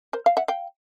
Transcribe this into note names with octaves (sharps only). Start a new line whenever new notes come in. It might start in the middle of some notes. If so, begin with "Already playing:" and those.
A#4 C5
F5
E5 F#5
F5 G5